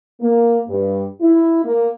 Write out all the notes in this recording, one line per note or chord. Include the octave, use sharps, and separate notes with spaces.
A#3
G2
E4
A#3